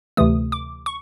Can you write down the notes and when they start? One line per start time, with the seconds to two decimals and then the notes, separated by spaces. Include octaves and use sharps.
0.17 D2 C3 E3 A3 D#6
0.52 D6
0.86 C#6